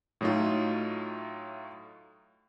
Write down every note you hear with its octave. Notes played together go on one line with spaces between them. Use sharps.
A2 F#3 A3 D#4 F4